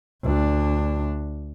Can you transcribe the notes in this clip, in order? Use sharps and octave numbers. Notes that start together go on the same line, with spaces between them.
D2 D4